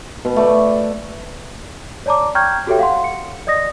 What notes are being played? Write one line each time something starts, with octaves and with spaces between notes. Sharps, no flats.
B2
A3 D5
C#5 D5 A5 A#5 D6
G5 A#5 C#6 F6 G6 G#6
F#4 G4 A4 C#5 E5 G5
F5 F#5 C6
C#7
D5 D#5 D#6 A#6